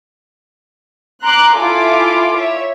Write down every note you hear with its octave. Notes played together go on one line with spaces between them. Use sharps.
A#5 C6 D6 F#6
E4 F4 A4 G#5 D6
C#5 E5